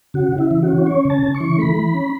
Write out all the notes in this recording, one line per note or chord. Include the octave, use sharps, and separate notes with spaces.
C#3 F#4
C#3
E4
E3
F#4
C#4
C#4 C#5
C#3
A5
C#3
C#6
E3
A3 B5
E3
C#4